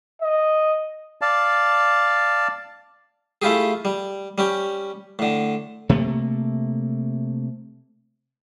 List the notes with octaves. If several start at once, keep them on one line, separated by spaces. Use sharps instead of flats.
D#5
D5 F5 A5
A3 E4 F4 G4 G#4
G3
G3 C#4 G4
A2 D3
C3 A3 A#3